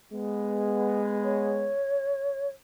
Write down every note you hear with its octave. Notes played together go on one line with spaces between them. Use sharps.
G#3 B3
C#5